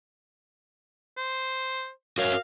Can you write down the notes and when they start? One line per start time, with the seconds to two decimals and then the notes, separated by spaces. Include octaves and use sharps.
1.17 C5
2.18 F#4 A#4 C#5 F5